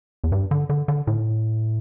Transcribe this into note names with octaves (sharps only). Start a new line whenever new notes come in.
E2
G2
D3
D3
D3
A2